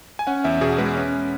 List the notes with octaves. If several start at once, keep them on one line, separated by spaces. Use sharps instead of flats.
G#5
C#4 F#5
E2 E5
B2 G#4
G#3 B4
C#4